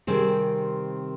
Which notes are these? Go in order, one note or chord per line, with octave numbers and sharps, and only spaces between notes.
C3 D#3 G3 C4 G#4 C5